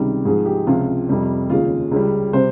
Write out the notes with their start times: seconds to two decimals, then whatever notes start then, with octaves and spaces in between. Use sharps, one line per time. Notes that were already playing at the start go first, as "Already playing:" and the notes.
Already playing: C#2 C3 D#3 G3
0.25 G#2 F3 G#3 G#4
0.46 G4
0.67 C#2 C3 F3 F4
1.09 F2 C3 G3
1.49 D#2 C#3 G#3 F4
1.91 C#2 C#3 G3
2.33 C3 G3 C5